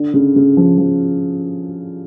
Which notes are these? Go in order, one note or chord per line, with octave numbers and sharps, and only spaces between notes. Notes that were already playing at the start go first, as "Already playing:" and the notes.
Already playing: D3
C#3
C#3
F3
F3